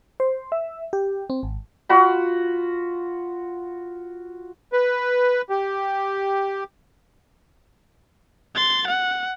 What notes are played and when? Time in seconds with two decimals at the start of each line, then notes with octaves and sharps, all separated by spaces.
0.20 C5
0.52 E5
0.93 G4
1.30 C4
1.43 G#1
1.89 F4 F#4 B5
4.73 B4
5.50 G4
8.55 C6 A6
8.87 F#5